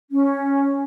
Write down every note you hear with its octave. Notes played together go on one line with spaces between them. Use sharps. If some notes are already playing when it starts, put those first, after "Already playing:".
C#4